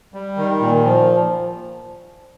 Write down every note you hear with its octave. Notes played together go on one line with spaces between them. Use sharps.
G3
D#3
A#2
F3